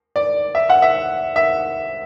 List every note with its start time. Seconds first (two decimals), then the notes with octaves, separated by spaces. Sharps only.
0.16 D5
0.55 E5
0.70 F#5
0.82 E5
1.36 E5